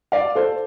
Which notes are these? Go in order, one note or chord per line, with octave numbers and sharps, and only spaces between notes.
D5 F5
A4 C5